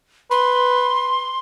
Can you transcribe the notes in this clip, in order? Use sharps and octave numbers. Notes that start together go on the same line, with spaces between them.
B4 C6